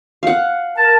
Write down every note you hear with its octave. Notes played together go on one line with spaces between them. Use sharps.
F5 F#5
A#4 A5